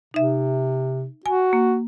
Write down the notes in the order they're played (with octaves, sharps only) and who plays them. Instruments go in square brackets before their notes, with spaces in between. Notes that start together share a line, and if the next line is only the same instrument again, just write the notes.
[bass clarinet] C3 [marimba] D#4 E5
[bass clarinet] F#4 [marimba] G#5
[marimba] A#3